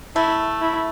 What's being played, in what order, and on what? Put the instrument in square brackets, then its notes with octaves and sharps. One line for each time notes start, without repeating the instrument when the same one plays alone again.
[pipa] A3 [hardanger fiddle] E4
[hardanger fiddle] E4